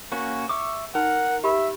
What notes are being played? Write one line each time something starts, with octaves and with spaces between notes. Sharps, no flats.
A#3 C#4 F#4
E5 C#6 D6
D#4 A#4 F#5
G4 E5 B5